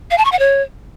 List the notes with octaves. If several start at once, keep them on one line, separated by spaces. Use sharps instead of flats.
F5
A5
C#6
F#5
C#5